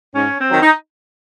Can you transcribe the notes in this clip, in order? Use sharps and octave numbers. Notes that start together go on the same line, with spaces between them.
G#2 C#4
C4
D#3 F#3
D#4